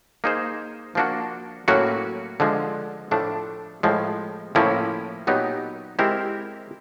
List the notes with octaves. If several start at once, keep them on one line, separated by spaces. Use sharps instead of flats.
A#3 D#4 G#4 C5
F3 A#3 D4 F#4
A2 F#3 A#3 C#4 F#4
D3 F3 G#3
A2 F3 A3 D4
A2 F3 G#3
A2 F3 A#3 C#4 E4
A#2 F#3 B3 D#4 G4
G#3 C4 E4 G4 A#4